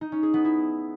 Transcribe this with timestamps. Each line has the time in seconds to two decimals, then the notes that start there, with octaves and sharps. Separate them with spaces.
0.01 D#4
0.12 C#4
0.23 G#4
0.34 B3
0.44 E4